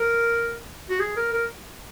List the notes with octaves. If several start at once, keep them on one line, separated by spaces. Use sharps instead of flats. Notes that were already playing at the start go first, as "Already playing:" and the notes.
Already playing: A#4
F#4
G#4
A#4
A#4